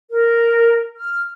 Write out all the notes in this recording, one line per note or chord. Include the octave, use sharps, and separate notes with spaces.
A#4
F6